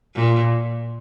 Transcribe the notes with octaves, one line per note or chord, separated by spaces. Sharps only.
A#2